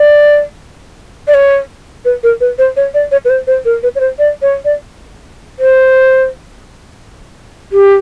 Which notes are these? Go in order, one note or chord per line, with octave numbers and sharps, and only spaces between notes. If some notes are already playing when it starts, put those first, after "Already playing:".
Already playing: D5
D5
C#5
B4
A#4
B4
C5
C#5
D5
C#5
B4
C5
C5
A#4
B4
C#5
C5
D5
C#5
D5
C5
G4